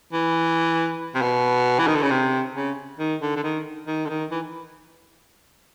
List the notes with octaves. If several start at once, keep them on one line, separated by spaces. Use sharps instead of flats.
E3
C3
B2
E3
D#3
D3
C#3
C3
C#3
D#3
D3
D3
D#3
D#3
D3
D#3
E3